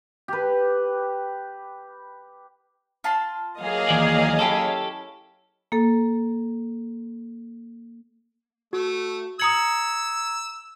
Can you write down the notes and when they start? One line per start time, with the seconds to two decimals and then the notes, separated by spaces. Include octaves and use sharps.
0.28 G4 B4
3.04 F4 A5 C6
3.59 F#3 A#3 G#4 D#5 F5
3.89 D#2 E3 D5
4.39 C#4 E4 G4 A4 C#5
5.72 A#3 A4
8.73 A3 F#4
9.40 A#5 D#6 E6 G#6 C#7 F#7